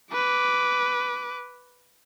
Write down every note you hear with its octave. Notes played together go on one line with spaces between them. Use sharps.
B4 D6